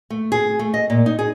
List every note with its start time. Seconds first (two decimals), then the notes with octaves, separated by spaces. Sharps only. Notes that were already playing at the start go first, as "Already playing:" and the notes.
0.10 A3
0.32 G#4
0.59 A3
0.74 D#5
0.90 A#2
1.06 D#4
1.19 G#4